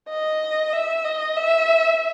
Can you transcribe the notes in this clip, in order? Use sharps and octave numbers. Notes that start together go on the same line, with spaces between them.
D#5
E5
D#5
E5